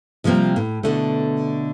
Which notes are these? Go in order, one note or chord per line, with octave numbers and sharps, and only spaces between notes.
C3 F3 G3 A#3 C4
A2
B2 D3 A3